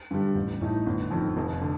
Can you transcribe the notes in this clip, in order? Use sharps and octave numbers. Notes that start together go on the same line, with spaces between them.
G2 D3 G3
A1
A2 A3 D#4
G1
F2 D#3
F1
D3